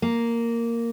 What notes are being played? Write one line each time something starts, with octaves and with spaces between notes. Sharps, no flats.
A#3